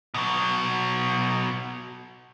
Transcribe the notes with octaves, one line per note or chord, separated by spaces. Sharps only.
B2 F#3